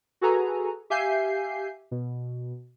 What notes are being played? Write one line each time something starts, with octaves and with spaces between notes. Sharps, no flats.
F#4 G#4 A4 B4 G#5 A#5
G4 E5 F5 G#5 G6 C7
B2